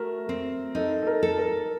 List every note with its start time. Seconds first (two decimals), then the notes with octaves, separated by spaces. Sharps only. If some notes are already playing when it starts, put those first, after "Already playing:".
Already playing: A3 F#4 A#4
0.29 C4
0.75 D#4 A4
1.02 A4
1.07 A#4
1.23 A4
1.38 A#4